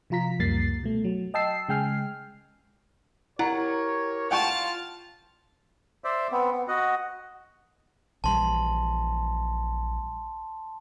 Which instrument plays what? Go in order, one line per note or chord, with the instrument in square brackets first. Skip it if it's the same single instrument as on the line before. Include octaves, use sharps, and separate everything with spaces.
[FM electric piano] C3 F3 F4 A#5 B6
C#2 F#2 G3 A#3 A6 C7
B2 A3
F#3
D#5 G5 A5 E6 C7
C#3 G#3 G5 G#5 F6 C7
[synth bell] E4 [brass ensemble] G4 A#4 C#5 [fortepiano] F#5 A#5
[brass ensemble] F4 [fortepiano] F#5 G5 C#6 [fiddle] A5 F6
[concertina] C5 D5 E5
B3 C4
B3
F#4 D#5 F#5
[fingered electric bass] A#1 E3 G3 [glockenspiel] A5 C6